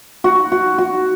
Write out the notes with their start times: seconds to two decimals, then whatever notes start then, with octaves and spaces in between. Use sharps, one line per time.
0.24 F#4
0.52 F#4
0.78 F#4